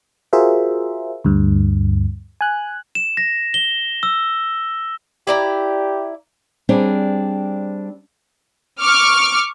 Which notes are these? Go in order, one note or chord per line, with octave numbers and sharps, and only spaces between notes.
F4 F#4 G#4 A#4 C5 E5
D2 G2
G#5 F#6
E7
A#6
G7
E6
E4 G4 D5 A#5
G3 C4 D4 G#4 C5 C#5
C#6 D6 F6